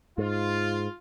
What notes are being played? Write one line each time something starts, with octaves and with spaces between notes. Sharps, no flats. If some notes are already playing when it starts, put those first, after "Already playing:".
G#2 F4